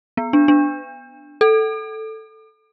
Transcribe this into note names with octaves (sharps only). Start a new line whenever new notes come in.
B3
D4
D4
A4